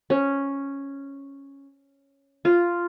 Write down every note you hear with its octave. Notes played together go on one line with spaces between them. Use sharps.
C#4
F4